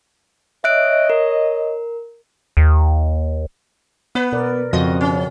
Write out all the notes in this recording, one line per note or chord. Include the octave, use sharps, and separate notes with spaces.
C#5 D#5 E5 F#6 D7
A#4
D#2
B3 B4
B2 A#4 D5
F2 C#3 C4 F#4 D#5
C#4